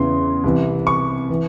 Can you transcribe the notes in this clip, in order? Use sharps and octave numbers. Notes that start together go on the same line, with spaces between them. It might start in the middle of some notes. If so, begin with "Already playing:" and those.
Already playing: E2 C#3 E3 C6
C2 C3 E3
C#6
E3